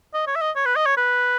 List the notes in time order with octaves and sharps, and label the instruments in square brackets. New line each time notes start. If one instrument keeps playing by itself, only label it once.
[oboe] D#5
C#5
E5
D#5
C#5
B4
D#5
C#5
B4